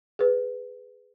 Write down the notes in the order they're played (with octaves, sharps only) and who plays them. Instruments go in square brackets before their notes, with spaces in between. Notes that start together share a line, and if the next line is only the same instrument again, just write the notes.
[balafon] G#4 B4